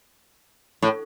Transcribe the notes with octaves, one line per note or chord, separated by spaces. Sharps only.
A2